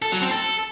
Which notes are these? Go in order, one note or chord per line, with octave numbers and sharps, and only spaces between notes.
A4
F#3
C4
A4